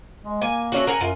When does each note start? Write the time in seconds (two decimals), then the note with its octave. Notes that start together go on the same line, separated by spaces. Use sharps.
0.23 G#3
0.42 A#3 G#5
0.72 A3 C#4 F#4
0.87 A#4 F#5 G#5
1.01 F#2 F4